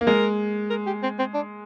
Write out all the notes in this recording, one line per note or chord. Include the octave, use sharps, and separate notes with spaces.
A#3
G#3 A#4
A#4
G4
C4
C4
D4